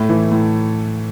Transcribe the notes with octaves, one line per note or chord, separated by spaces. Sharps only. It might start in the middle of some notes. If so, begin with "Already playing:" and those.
Already playing: A2 A3
E3
A2